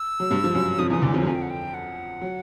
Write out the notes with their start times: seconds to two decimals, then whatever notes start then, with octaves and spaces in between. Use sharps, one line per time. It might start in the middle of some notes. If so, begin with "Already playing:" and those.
Already playing: E6
0.20 F#3
0.30 G2 G3
0.44 F3
0.54 F#2 F#3
0.78 F2 F3 D#6
0.90 E2 E3 D#6
1.02 D2 D3 D6
1.14 F2 F3 G#5
1.21 F#3
1.26 F2 F3 G#5
1.35 G5
1.42 F#5
1.50 G5
1.74 F#5
2.22 F#3